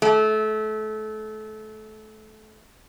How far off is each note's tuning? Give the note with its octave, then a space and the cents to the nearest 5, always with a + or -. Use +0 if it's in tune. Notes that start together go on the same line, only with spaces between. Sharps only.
A3 -25